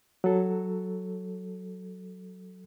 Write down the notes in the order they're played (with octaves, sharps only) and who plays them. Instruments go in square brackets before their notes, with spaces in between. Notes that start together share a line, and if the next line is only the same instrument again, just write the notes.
[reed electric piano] F#3 A4